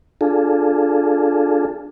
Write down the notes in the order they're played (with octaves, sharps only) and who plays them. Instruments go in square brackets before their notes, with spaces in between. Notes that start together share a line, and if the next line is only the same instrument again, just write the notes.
[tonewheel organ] D4 F4 G#4 A4